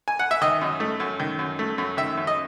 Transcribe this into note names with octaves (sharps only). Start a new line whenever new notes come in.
G#5
F#5
E5
D#3 D#5
F#2
A3
F#2
D#3
F#2
A3
F#2
D#3 E5
F#2
D#5